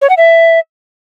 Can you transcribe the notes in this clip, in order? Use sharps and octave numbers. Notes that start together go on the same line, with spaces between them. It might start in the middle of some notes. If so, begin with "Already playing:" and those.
C#5
F#5
E5